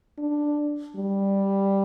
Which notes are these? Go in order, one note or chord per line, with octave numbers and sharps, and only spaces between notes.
D4
G3